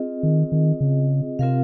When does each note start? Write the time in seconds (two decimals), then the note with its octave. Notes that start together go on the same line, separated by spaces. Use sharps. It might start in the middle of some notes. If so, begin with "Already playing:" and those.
Already playing: C4 F4 G#4 D#5
0.23 D#3
0.52 D#3
0.81 C#3
1.39 C3 C4 F4 A#4 F5